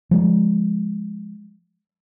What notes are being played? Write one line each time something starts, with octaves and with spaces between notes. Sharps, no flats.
F3 G#3